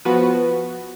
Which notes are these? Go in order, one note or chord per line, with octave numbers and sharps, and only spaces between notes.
F3 B3 F#4 B4